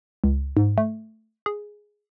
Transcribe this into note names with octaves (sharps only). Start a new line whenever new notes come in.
C#2
G#2
A3
G#4